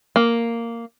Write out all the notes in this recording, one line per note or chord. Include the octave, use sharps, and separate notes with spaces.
A#3